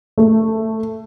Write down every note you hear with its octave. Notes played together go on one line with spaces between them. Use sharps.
A3